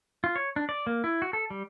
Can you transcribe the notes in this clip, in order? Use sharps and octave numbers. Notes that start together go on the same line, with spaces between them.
F4
C#5
D4
D5
A#3
E4
F#4
A4
G3